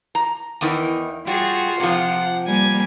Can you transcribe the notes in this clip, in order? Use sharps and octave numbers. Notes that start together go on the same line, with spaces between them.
A#5
E2 D#3 E3
G3 F4 F#4 G#4
C3 F3 F#5
G3 A#3 G#5